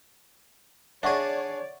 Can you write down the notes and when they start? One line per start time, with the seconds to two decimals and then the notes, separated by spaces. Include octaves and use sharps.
1.03 D4 G#4 C#5 D5 E5 F#5 C#6